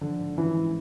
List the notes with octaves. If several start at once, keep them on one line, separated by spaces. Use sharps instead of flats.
D3 F3
G#2
E3 C#4
G#2